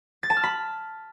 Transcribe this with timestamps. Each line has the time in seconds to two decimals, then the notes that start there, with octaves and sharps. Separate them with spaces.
0.23 A6
0.30 A5
0.37 F6
0.43 B5